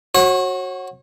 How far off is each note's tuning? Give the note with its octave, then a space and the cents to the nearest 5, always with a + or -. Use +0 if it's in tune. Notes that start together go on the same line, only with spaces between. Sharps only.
F#4 +0 C#5 -35